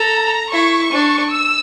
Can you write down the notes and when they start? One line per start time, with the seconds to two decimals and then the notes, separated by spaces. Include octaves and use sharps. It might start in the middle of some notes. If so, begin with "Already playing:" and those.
Already playing: A4 A#5
0.52 E4 C#6
0.92 D4
1.32 E6